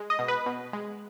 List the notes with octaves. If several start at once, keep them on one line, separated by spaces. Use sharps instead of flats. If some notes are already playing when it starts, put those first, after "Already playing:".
Already playing: G#3
D#5
B2
B4
B2
G#3